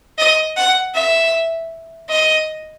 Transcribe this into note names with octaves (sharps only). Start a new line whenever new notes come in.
D#5
F#5
E5
D#5